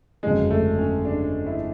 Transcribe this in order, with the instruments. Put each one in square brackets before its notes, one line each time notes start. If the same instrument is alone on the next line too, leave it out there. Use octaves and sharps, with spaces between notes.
[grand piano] G1 F2 C#3 F#3 [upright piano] G#3
[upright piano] A3
C#4
D4
E4